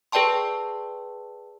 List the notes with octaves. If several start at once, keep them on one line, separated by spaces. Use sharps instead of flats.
G#4 B4 D5 G5 A5 C6